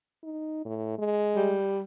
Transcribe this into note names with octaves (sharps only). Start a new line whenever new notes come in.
D#4
A2
G#3
G3